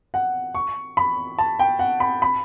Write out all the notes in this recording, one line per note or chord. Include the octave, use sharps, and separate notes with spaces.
F#5
C#6
B5
A5
G5
F#5
B5
B5